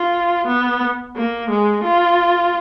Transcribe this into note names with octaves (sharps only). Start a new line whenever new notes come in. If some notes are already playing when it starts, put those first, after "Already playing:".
Already playing: F4
B3
A#3
G#3
F4